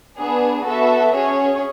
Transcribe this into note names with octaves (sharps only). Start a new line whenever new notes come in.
B3 D4 G#4
B3 F#4 A4 E5
C#4 G#4 C#5